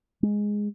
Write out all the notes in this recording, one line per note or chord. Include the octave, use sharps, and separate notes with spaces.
G#3